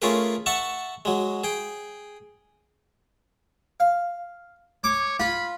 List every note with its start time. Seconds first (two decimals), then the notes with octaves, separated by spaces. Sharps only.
0.02 A3 C#4 F4 G#4 A#4 B4
0.46 E5 F#5 A5 C#6
1.05 F#3 G#3
1.44 G#4 G5
3.80 F5
4.84 C#5 D6
5.20 F4 B5